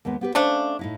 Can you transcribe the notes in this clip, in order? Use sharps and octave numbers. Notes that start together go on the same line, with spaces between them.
D#2 G#3 B3
B3 G4 B4
A3 C#4 D4 C5 F5
A2 D#4 E4